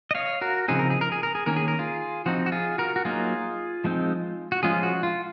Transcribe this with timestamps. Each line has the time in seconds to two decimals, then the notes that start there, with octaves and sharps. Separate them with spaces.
0.11 D#5
0.15 C#5 F5
0.41 F#4 A#4
0.68 C#3 F3 C4 D#4 G#4
0.79 A#4
0.90 G#4
1.01 A#4
1.12 G#4
1.23 A#4
1.35 G#4
1.46 D#3 A#3 C#4 A#4
1.56 G#4
1.68 A#4
1.79 F4 G#4
2.26 F3 C4 D#4 F#4
2.46 F#4
2.52 F4 G#4
2.78 F#4 A#4
2.96 F#4
3.05 F#3 A#3 D#4 F4 G#4
3.84 F3 G#3 C4 D#4
4.52 F#4
4.63 F3 G#3 C#4 F4 G#4
4.83 F#4
5.03 F4